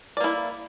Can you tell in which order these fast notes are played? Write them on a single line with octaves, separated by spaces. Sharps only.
D5 A#3 E4